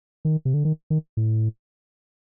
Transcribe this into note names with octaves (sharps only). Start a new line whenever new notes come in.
D#3
C3
D3
D#3
D#3
A2